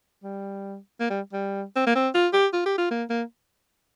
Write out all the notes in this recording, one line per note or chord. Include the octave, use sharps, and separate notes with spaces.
G3
A#3
G3
G3
C4
A#3
C4
F4
G4
F4
G4
F4
A#3
A#3